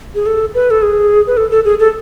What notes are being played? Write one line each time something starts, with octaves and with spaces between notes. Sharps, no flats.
G#4
A4
B4
A4
G#4
B4
A4
A4
G#4
A4